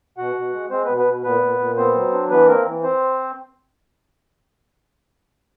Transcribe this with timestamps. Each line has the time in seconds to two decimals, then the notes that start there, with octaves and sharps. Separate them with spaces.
0.17 B2 F#4 F#5
0.35 B2
0.53 G#3
0.70 G#3 C4 C5
0.85 B3 B4
0.89 B2
0.97 B3 B4
1.06 B2
1.24 A#2 B3 B4
1.42 A#2
1.59 A#2
1.77 B3 C4 C5
1.94 F#3
2.13 D4
2.30 E3 B3 B4
2.47 A#3 C4 A#4
2.65 E3
2.83 C4 C5